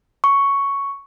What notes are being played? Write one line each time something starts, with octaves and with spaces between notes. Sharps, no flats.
C#6